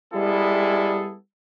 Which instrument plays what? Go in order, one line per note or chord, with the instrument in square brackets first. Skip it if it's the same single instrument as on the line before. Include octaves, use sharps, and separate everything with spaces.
[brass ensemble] G3 G#3 B3 E4 G#4 A4